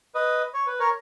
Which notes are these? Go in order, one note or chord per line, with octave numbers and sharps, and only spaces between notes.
B4 D#5
C#5
B4
A#4 C#5